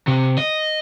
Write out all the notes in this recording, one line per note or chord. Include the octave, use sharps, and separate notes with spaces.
C3
D#5